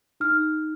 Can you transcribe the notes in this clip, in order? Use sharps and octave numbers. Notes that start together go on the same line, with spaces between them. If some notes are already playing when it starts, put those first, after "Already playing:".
D#4 F6